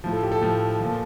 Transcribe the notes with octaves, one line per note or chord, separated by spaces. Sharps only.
A2 F3
A4
G4
A4
A2 F3
A#2 F3